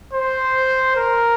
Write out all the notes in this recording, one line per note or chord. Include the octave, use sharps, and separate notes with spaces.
C5
A#4